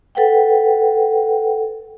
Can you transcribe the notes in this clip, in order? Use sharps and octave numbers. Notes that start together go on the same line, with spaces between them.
A4 B4 F#5 G5